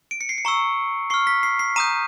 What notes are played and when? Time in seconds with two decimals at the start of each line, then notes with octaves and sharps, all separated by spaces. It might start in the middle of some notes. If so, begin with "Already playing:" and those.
0.11 D7
0.21 C#7
0.29 C7
0.38 C#7
0.45 A#5 C#6 E6
1.10 C#6 F6 C7
1.27 B6
1.43 C7
1.59 C7
1.76 A#5 D#6 G6 D#7